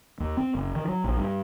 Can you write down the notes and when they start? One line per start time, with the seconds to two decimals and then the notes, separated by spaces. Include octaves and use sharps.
0.20 D#2
0.37 C4
0.55 F#1
0.75 D#3
0.88 F#3
1.04 A#1
1.17 G2